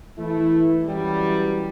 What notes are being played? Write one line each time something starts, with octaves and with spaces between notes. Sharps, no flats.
E3 A3 E4
F#2 E3 F#3 G3